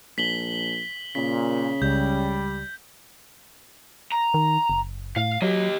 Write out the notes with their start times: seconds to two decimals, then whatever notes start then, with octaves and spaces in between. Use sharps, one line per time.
0.18 A#1 B6 F#7 G7
1.15 A#2 C#3 B6
1.82 C#2 G3 G6
4.12 A#5
4.34 D#3
4.70 F#1
5.16 A2 F5
5.42 F#3 G4 D#5